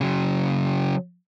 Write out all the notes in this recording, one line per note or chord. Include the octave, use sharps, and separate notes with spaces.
C#3 F#3